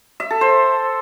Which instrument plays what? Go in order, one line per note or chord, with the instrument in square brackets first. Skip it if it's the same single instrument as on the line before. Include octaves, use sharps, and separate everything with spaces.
[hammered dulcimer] E5
A4
C5